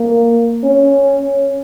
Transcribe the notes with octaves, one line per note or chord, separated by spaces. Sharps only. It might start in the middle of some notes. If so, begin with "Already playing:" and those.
Already playing: A#3
C#4